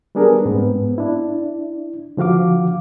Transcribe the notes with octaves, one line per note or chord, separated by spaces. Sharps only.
G3 B3 D4 G#4 A#4
G#2 B3 C4
D4 E4
D3 F3 F#4 F5 D6